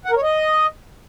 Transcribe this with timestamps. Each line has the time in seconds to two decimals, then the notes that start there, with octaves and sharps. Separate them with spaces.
0.05 F#5
0.11 A#4
0.17 C#5
0.22 D#5